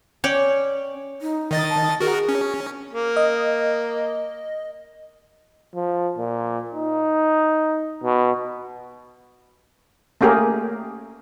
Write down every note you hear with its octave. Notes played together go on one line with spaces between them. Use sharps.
C#4 C#5 D5 G5
D#4
D#3 D#5 A6
A5
F#4 G#4 A#4
C#4
A#3
D#5
F3
A#2
D#4
B2
A3 A#3 C#4 G4 G#4 A#4